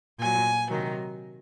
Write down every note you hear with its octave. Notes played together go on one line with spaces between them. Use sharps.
A#2 F#3 G#5
C3 D#3 F#3